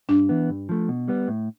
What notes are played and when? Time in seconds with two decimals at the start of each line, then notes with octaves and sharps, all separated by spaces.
0.09 G2 D4
0.29 E3 B3
0.49 G2
0.69 F3 A3
0.89 B2
1.08 G3 B3
1.28 A2